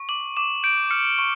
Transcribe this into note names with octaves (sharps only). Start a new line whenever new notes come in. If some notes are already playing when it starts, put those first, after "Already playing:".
Already playing: C#6
D6 F#7
D6 E7
G6 D7
F6 C#7
C#6